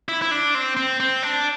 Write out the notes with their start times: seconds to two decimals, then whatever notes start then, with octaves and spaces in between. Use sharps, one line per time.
0.09 E4
0.22 E4
0.31 D4
0.55 C4
0.77 C4
1.00 C4
1.23 D4